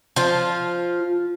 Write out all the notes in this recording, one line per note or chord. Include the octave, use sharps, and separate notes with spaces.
F3 F4